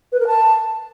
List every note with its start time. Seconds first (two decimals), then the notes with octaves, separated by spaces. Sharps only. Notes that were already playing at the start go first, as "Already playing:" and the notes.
0.12 B4
0.19 A#4
0.27 A5